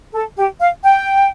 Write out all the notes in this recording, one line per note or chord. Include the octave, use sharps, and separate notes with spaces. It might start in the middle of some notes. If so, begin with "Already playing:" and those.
A4
G4
F5
G5